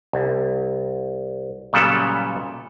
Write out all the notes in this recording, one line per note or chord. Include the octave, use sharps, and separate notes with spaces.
C2
A#2 C#3 F#3 G3 B3 A4